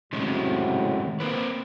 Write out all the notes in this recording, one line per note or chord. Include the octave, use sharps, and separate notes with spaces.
A2 C3 D#3 F#3 G#3 C#4
A#3 C4 B4